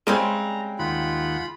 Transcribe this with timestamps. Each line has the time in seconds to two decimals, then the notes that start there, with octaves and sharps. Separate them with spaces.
0.07 C#3 G3 G#3 C4 A#5
0.79 D#2 F4 F#5 B5